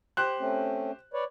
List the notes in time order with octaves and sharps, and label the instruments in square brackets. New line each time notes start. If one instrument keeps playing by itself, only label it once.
[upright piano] G4 C5 F#6
[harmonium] A3 C4 C#4
B4 C#5 D5